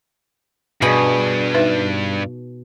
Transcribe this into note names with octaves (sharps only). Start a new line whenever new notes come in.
G2 B2 G#4 B5
D#4 B4 E5